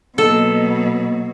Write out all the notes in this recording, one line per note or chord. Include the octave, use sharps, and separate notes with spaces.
B2 F#3 A#3 A4 D#5